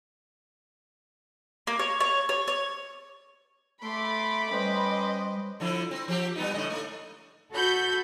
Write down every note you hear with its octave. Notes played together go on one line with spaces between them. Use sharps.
A#3
C#5
C#5
C#5
C#5
A3 B5 C6 D6
G3 C#4 B4 C5 D#5 C6
D3 F3 E4
C4
F3 G4
G3 B3 D#4
A2 D3 D#5
A3
F#4 A4 B5 G6